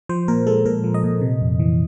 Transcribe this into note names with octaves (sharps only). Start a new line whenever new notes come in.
F3 C5
A#2 A#4
G#3 A4
A#2 A#4
F3
D#5
A#2
C3
F2
E3